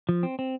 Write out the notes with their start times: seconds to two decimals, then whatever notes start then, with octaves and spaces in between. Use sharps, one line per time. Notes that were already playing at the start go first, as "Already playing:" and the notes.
0.09 F3
0.23 C4
0.39 C4